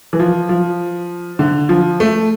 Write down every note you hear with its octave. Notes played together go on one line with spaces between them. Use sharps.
E3
F3
F3
D3
F3
A3